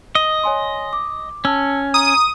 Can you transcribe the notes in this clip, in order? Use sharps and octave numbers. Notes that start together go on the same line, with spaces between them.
D#5
C#5 G#5 C6
D6
C#4 A5 E6
A#5 D#6